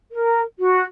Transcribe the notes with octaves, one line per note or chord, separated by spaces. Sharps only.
A#4
F#4